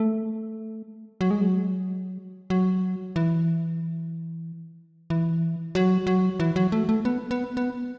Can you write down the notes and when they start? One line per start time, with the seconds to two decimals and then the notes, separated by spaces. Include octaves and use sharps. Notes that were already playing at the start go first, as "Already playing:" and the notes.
Already playing: A3
1.21 F#3
1.31 G#3
1.41 F#3
2.50 F#3
3.16 E3
5.10 E3
5.75 F#3
6.07 F#3
6.40 E3
6.56 F#3
6.72 A3
6.89 A3
7.05 B3
7.31 B3
7.57 B3